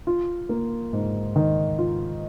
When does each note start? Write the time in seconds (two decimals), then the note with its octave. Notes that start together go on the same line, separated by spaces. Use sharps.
0.07 F4
0.49 A#3
0.93 G#2
1.36 D#3
1.78 F4